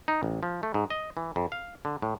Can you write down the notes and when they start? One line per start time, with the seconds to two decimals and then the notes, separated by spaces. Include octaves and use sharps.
0.08 D#4
0.23 A1
0.43 F3
0.63 A3
0.74 G#2
0.90 D#5
1.17 E3
1.36 F2
1.52 F5
1.85 D3
2.02 A2